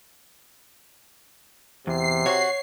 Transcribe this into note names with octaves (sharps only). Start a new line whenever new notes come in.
E2 C3 C7
F#4 C#5